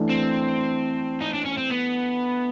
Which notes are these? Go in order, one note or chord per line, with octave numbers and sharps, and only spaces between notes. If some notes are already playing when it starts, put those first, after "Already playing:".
Already playing: E3 A3 D4
C4
D#4
D4
C#4
C4
B3